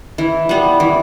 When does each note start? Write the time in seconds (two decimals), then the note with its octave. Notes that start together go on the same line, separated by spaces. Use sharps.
0.18 E3
0.49 G3 B3
0.80 E3